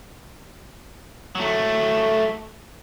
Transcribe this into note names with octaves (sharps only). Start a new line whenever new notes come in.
F#3 A3